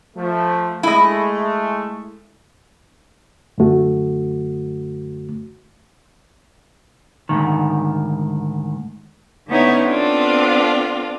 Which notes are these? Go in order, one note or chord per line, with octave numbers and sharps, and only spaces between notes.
F3 A3
G#3 A3 E4 D#5
F#2 D3 A3 F#4
D2 G#2 D#3
D3 B3 C#4 D#4 E4 C#5
B3 C4 D4 F4 A4